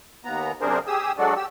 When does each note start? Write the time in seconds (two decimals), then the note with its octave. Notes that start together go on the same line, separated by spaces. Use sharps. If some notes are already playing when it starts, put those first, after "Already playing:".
0.25 D#2 B3 A#5
0.61 F#2 C3 D4 G#4 A#4 C5
0.87 G4 G#4 D#6 E6
1.18 F#3 G#3 D4 F#4 A4 D5
1.36 G4 E6